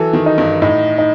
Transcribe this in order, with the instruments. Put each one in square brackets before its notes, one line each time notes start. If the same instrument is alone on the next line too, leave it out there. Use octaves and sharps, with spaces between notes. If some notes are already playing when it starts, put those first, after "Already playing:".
Already playing: [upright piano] E3 F#3 [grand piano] A4
[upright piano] D#3
[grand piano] D#4
[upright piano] G2
[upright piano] A2 [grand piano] D#4
[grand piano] D#4